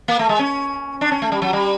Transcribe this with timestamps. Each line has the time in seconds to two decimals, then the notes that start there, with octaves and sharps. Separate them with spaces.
0.08 A#3
0.19 A3
0.29 G#3
0.39 C#4
1.01 D4
1.12 C#4
1.22 A3
1.32 G3
1.42 F#3
1.53 G3